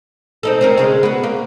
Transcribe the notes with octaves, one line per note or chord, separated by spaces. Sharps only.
C4 D#4 A4
C4 C#4 A#4
C#3 G#3
B3 F#4
A#3